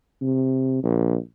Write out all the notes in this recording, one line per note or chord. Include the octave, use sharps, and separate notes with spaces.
C3
A#1